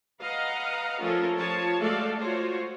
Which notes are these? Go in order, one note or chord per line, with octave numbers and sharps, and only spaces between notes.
B4 D#5 F5 F#5 A#5
F3 A3 C#4 F4 A4 A#4
F3 F4 C#5 A5
G#3 A3 F#4 A4 D5 F5
F4 F#4 C5 C#5